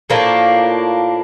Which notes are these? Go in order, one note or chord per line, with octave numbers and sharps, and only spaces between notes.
A2 F3 A#3 D4